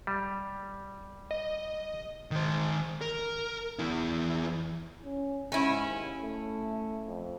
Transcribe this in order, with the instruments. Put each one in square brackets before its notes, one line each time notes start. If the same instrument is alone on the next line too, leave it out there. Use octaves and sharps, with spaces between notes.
[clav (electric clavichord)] G3
[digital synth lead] D#5
[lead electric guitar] D#3 C5
A#4
E2 E4
[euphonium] C#4
[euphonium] G#2 [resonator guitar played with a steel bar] C#4 E4
[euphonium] D#2
A3
F2